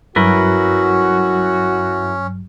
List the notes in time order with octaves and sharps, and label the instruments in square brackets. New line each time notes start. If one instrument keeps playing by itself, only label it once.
[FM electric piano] G2 F#3 [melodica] C#4 [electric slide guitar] E4 A#4 B4 [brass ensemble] F#4